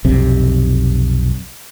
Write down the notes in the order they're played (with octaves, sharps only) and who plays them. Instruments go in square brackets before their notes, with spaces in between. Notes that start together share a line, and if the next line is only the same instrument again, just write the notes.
[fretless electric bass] B1 F2 C3